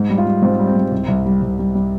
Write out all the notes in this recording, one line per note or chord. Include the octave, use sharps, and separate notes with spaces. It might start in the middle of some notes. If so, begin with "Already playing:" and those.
Already playing: G#2
G3
F4
G3
G#2 C4
G3
C4
G#2
C2 C4
C2
G3
C2
G3
G3